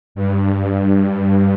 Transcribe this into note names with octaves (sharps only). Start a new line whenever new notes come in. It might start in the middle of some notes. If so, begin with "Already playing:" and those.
G2